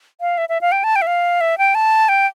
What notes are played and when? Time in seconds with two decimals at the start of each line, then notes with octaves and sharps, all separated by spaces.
0.21 F5
0.38 E5
0.49 E5
0.61 F5
0.72 G5
0.84 A5
0.96 G5
1.02 E5
1.07 F5
1.41 E5
1.58 G5
1.75 A5
2.09 G5